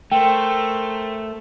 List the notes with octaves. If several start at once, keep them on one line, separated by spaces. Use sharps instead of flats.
A3 A#4 C5 G5